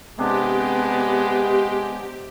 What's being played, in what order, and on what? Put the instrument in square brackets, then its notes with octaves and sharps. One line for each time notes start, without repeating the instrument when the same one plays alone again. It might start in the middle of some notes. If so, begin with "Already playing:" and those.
[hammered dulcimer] C3 D4 [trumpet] G#3 [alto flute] B3 [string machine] G4